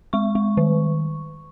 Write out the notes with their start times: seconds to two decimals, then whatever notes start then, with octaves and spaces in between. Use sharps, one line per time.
0.13 G#3 C#6
0.35 G#3
0.57 D#3